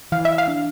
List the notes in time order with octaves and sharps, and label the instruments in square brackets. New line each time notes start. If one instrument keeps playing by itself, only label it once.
[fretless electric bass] E3 [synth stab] F5
[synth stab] E5
F5
[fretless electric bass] D4